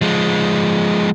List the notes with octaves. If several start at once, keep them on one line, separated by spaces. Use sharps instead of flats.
F3 G#3